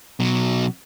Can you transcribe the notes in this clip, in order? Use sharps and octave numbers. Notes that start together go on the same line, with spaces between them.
B2 F#3